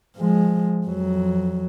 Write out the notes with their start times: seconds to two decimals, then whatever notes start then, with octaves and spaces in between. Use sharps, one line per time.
0.17 F3 G#3
0.86 F2 F#3